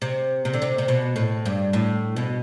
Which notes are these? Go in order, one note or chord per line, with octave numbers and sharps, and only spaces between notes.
C3
C3
D3
C3
C3
B2
A2
G2
A2
B2